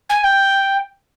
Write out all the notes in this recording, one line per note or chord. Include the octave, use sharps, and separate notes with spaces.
G#5
G5